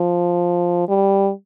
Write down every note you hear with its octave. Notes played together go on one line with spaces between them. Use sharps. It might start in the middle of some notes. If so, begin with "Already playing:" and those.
Already playing: F3
G3